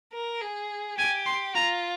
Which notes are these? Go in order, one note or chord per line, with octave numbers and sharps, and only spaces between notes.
A#4
G#4
G4 G#5
C6
F4 A#5